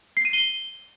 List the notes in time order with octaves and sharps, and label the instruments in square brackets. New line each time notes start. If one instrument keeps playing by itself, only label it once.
[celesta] C7
D#7
G7